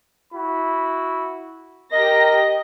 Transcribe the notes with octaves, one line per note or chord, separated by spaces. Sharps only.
E4 F#4 B5
G4 A#4 D#5 A#6